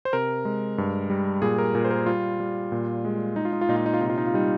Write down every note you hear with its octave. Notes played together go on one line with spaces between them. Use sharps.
C5
C3 A#4
G#3
G2
G3
A#2 G#4
A#4
A#2 A#4
C5
A#4
G3 F4
G3
A#2
G#3
G#3 D#4
F4
D#4
F4
A#2 D#4
F4
D#4
F4
C3 D#4
F4
D#4
F4
G3 D#4